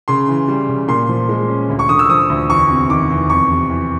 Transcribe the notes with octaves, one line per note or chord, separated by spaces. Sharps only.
C#3 C6
E3
G3
C#3
A#2 C6
F3
G#3
C#4
D2
C#6
D3 D#6
E6
F3 D#6
D2
E2 C#6
C3
D#3 D6
E2
F2 C#6
C3
E3